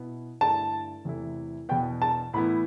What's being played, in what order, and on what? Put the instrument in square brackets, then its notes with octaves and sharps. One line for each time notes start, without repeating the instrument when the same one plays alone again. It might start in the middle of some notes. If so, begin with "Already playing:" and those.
Already playing: [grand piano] B2 B3 E4
[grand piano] G2 D3 A3 E4 [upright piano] A5
[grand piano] E2 C3 E3 A3 E4
[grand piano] E2 B2 B3 [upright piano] G5
[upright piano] A5
[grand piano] A2 E3 B3 E4 [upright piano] B5